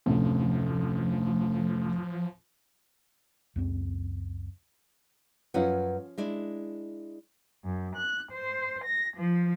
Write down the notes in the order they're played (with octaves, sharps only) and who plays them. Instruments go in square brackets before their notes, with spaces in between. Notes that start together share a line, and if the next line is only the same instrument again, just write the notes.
[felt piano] F1 D2 A2 [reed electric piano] C3 C#4 [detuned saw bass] F3
[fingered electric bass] C#2 F#2 C4
[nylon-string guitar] F#2 B4 F#5 [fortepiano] F3 C#4 F5
[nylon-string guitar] G#3 D4 E4
[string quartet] F#2
F#6
C5
A#6
F3